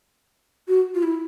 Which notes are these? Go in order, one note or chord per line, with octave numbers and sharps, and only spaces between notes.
F#4
F4
E4